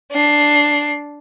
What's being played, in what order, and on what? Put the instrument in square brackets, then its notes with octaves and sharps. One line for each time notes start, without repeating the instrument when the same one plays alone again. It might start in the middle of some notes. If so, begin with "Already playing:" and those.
[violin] D4 C7